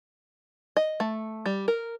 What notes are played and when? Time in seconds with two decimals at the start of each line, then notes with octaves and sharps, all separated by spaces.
0.77 D#5
1.00 A3
1.46 G3
1.68 A#4